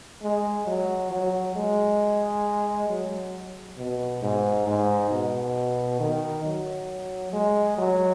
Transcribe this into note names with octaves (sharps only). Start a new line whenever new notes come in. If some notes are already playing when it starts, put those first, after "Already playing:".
G#3
F#3
F#3
G#3
F#3
B2
G#2
G#2
B2
D#3
F#3
G#3
F#3